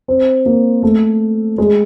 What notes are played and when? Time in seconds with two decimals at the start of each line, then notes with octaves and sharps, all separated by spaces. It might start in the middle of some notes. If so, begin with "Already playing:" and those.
0.08 C4
0.46 A#3
0.83 A3
1.58 G#3